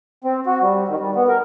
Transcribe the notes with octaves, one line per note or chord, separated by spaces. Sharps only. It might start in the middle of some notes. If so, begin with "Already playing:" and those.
C4
F#4
G3
D#3
G3
B3
A#4